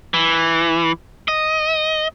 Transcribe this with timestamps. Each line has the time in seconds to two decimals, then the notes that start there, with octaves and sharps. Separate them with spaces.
0.14 E3
1.28 D#5